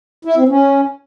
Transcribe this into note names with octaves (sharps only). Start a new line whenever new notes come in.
E4
C4
C#4